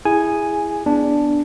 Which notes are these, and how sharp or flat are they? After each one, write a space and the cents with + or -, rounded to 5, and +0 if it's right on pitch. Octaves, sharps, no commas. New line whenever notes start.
E4 +0 G#4 -15 G#5 +0
B3 +0 D4 +0